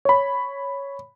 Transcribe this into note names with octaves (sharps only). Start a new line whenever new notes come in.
C#5 B5